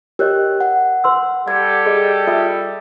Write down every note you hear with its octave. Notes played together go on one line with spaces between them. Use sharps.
G4 A#4 C#5 D#5 F#6
F#5
B4 C6 E6
G3 G4 A4 F#5 G#6
G#4 D#5
F4 E5 D#6